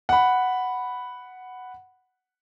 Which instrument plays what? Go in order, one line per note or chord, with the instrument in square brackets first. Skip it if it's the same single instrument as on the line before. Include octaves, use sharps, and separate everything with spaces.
[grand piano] F#5 B5